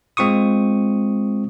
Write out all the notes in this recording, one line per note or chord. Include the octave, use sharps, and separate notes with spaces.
G#3 C4 F4 C#6 D#6